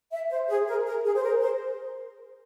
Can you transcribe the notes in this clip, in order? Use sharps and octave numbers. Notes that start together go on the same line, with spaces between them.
E5
C5
G#4
A#4
A#4
G#4
C5
A#4
C5